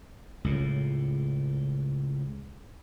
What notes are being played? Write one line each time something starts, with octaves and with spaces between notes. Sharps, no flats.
C#2 A2